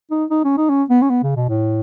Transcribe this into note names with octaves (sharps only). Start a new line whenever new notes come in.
D#4
D#4
C#4
D#4
C#4
B3
C#4
B3
C#3
B2
A2